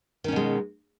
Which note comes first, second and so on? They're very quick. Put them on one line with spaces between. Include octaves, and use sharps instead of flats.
D#3 C#4 B2 G#3